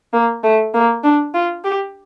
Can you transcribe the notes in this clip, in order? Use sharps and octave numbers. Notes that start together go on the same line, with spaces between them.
A#3
A3
A#3
D4
F4
G4